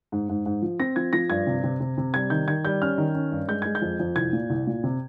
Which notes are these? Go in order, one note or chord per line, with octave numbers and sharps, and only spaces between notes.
G#2
G#2
G#2
F3
C4 A#6
F3 G#6
F3 A#6
G2 G#6
C3
C3
C3
C3
G3 G#6
D#3 G6
D#3 G#6
G3 G6
C#4 F6
D#3
C#4
G2
G#3 G6
G#3 G#6
G6
F2
F2
C2 G#6
A#2
C2
A#2
C3